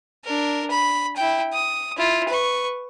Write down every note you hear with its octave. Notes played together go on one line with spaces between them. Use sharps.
D4 A#4
B5
E4 G5
D#6
E4 F4
B4 C#6